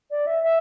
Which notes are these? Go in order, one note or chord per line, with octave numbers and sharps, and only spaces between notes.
D5
E5
E5